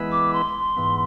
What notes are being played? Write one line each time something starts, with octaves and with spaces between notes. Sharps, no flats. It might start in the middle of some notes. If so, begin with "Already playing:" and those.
Already playing: E3 G#3 B3 E4 B4
D6
C6
G#2 E3 B3